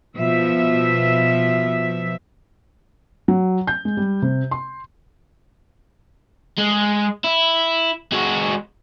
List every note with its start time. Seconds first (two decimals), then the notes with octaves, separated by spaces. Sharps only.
0.17 B2 F3 E5
3.28 F#3
3.67 G6
3.85 G#3
3.97 G3
4.22 C3
4.51 C6
6.58 G#3
7.24 E4
8.12 G#3 F#4